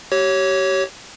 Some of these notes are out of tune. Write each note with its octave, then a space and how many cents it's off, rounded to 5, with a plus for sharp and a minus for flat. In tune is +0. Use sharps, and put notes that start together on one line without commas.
G4 -30 C#5 +0